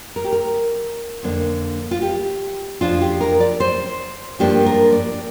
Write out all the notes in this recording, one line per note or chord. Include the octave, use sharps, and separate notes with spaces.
A#4
G4
A#4
F2 D3 A#3 D4
F4
G4
F2 F3 D4 F4
G4
A#4
D5
C5
G2 F3 A#3 D4 G4
A#4
D5